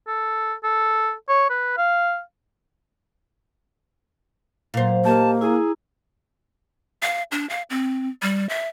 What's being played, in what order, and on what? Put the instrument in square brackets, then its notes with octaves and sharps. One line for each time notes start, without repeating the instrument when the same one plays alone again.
[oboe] A4
A4
C#5
B4
F5
[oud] A#2 C5 [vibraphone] F#3 F5
[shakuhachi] A#3 [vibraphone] G4 D#5 [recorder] A5
[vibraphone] E4 A#5 [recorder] G#4
[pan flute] F5
D4
F5
C4
G3
E5